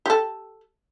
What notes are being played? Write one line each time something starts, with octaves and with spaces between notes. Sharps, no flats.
G4 A4